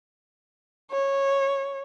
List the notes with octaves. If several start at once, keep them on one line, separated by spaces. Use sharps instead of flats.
C#5